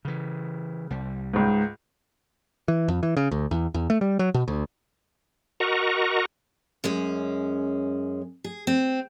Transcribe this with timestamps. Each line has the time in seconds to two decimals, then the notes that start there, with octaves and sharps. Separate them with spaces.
0.05 C#3 E3
0.90 C2 G3
1.34 C#2 G#2
2.68 E3
2.88 F2
3.03 E3
3.17 C#3
3.31 D2
3.51 E2
3.74 E2
3.90 A3
4.01 G3
4.19 F#3
4.34 B2
4.48 D2
5.60 F#4 A#4 D#5 F#5 A#5 C#6
6.84 F#2 G#3 C#4
8.44 G#4
8.67 C4